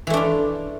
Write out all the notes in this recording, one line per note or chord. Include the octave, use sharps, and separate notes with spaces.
E3 A3 D4 F4